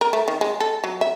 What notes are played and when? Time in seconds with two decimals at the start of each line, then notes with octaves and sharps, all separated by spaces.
0.01 A#4
0.13 A3
0.28 D#3
0.41 G#3
0.60 A4
0.84 F#3
1.01 E5